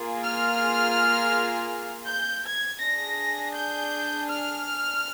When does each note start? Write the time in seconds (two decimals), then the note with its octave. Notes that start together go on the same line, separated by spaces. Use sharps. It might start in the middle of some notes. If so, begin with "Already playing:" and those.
Already playing: A#3 F4 G#4
0.22 F6
2.07 G6
2.44 G#6
2.80 D4 G#4 A#6
3.55 G6
4.29 F6